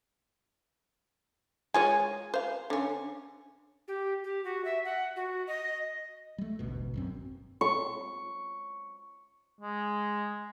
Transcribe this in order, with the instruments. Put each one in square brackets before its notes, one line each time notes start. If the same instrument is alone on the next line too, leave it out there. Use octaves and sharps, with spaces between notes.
[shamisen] G#3 F4 C#5 [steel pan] G#5
[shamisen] C5 F5
D3 C#4
[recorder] G4
G4
F#4
E5
F#5
F#4
D#5
[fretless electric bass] G3 A3
E1 A1 D2 B2
G1 F#2 C4
[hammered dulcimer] C#6
[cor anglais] G#3